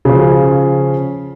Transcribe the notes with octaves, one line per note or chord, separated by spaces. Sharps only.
C#3 F3